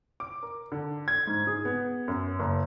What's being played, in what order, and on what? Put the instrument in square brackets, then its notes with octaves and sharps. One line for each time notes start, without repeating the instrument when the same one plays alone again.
[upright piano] D6
A#4
D3
G#6
G#2
G#4
B3
F#2
F#1